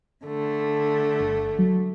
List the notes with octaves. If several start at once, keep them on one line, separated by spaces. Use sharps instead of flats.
D3 A3
G1
F#3